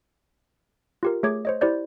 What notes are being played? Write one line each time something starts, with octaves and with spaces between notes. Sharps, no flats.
F4 G4 A#4
A3 G#4 C#5 D6 G#6
C5 C#5 D#5
E4 G4 C5 D5 G6